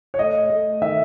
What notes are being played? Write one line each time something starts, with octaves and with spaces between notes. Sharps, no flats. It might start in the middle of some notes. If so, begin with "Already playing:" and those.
C#5
A3 D#5
A3
D#3 E5